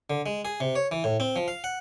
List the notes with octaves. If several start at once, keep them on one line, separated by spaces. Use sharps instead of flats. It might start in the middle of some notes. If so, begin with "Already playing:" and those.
D3
G#3
G#4
C3
C#5
E3
A2
C4
F3
F5
F#5